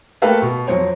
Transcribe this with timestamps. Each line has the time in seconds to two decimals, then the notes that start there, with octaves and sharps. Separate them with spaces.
0.22 A3 A#3 A4 B4 F5 G5
0.42 B2
0.67 F2 F#3 C5 C#5